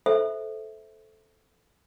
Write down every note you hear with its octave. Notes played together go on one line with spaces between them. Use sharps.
A4 C5 E5